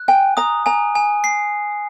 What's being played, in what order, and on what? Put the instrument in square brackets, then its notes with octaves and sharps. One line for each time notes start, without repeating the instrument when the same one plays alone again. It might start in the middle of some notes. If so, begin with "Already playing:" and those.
Already playing: [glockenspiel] F#6
[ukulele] G5 [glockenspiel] G#5
[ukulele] A#5 [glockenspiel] D#6
[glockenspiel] G#5 [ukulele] A#5
[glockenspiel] G#5
C7